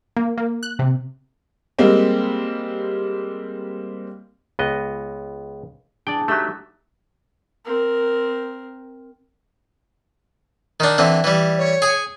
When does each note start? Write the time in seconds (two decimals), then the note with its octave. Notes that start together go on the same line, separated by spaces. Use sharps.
0.17 A#3
0.38 A#3
0.63 F#6
0.79 C3
1.79 G3 G#3 A#3 C4
4.59 C#2 B3 D#5
6.07 D4 G#4 D5 G5
6.28 F#3 A3 D#4 G4 E5
7.65 C4 A#4
10.80 D#3 D4
10.98 D3 E3 C4 E5
11.24 E3 G3
11.58 C#5
11.82 G#4 G#5